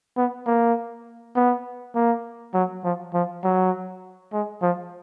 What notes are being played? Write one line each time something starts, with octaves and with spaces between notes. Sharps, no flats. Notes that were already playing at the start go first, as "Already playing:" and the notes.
B3
A#3
B3
A#3
F#3
F3
F3
F#3
G#3
F3